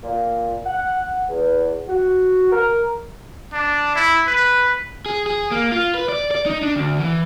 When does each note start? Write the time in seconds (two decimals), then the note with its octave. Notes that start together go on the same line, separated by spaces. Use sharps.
0.03 A#2
0.66 F#5
1.29 E2
1.88 F#4
2.52 A#4
3.53 D4
3.96 E4
4.28 B4
5.06 G#4
5.26 G#4
5.51 A#3
5.72 F4
5.94 B4
6.09 D5
6.31 D5
6.46 D#4
6.62 D4
6.76 D2
6.99 E3